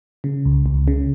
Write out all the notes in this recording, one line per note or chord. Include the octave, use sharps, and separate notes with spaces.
C#3
C#2
C#2
C#3